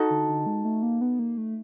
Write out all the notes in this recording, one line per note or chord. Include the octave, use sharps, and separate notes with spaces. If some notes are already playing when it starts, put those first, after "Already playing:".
Already playing: D#4 F#4 A4
D3
D3
G#3
A3
A#3
B3
A#3
A3